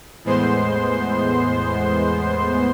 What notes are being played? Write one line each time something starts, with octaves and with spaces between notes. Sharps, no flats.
E2 A2 G#3 B3 C5 C6